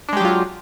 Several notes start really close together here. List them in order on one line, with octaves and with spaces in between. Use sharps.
D4 G#3 G4 F#3 F4